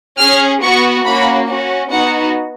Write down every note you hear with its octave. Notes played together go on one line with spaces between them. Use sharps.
C#4 G#4 F6
B3 F#4 C#6
A#3 C#4 F#4 B5
C#4 F#4
B3 D#4 F#4 F#5